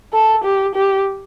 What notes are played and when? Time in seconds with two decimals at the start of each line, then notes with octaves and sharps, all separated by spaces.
0.13 A4
0.44 G4
0.75 G4